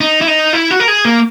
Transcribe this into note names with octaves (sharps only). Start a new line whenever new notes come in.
D#4
E4
D#4
E4
F#4
A#4
G#4
A#3